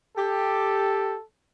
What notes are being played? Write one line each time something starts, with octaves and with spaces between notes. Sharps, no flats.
G4 A4